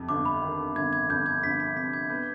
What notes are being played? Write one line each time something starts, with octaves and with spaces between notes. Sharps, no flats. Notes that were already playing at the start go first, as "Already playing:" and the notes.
Already playing: F2 C3
G1 D6
B5
D#3
G1 G#6
G#6
G1 G6
G#6
G1 B6
B6
C3 B6
G#6
B3 G6